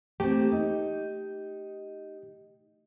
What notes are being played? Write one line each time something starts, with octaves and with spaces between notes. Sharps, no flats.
A3 A#3 C4 G4
D#4